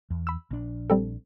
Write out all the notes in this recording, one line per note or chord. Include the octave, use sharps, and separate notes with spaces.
E2
B5 E6
A#1 D4
G3 C4 A4